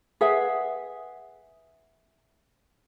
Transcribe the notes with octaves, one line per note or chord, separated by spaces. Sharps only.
G#4 B4 E5 F#5